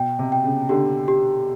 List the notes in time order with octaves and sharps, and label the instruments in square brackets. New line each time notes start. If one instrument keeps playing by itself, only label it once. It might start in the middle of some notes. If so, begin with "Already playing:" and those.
Already playing: [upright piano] B2 [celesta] G5
[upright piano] C3
[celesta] G5
[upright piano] C#3
[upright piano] D3 [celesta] G4
[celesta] G4